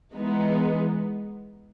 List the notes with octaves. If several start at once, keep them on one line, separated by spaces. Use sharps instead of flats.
E3 G#3 B3 D#4